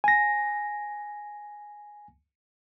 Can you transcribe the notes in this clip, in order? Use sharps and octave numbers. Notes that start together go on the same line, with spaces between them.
G#5 A#6